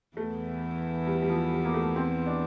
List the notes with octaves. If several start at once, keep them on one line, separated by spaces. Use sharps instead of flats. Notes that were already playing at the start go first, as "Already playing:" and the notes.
E2 E3 A3
G3
G3
F3
G3
A#3
A3
C4
D4